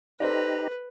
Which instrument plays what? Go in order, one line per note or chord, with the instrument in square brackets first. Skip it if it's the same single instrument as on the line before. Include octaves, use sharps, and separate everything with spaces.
[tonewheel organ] D#4 G4 A#5 [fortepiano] A4 C5 D5 [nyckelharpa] B4